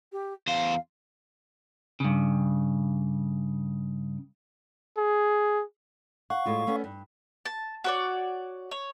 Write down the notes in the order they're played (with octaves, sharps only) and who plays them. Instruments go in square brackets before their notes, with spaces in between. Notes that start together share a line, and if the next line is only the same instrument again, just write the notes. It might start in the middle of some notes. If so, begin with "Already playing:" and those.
[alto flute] G4
[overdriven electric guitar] E2 C5 [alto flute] F5
[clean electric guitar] G2 C#3
[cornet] G#4
[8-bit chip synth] F5 C#6 [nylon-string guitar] F#5
[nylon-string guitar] A2 G#3 F4
A3 B3 C#4
G2
[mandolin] A5
F#4 C#5 D5
C#5